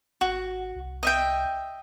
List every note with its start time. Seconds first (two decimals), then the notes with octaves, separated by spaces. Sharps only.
0.21 G#1 F#4
0.75 C2
1.03 D#5 E5 G5